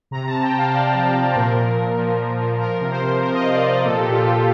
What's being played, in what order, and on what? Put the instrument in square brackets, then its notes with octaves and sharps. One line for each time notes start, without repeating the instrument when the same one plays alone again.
[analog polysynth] C3 A#5
A5
C3
G5
C3
F5
C3 D5
F3
F3
C5
A#2 A#4
A#2
F3
F3
A#2
F3
F3 A#4
C3
C5
F3
F3 A#4
D#5
C3 F5
D5
F3
A#4
A#2 A4
G4
A#2
F4
A#2 G4